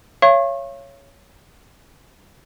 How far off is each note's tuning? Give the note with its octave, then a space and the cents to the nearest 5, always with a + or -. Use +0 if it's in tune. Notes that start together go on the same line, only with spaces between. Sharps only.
C#5 +0 F5 -40 C#6 -35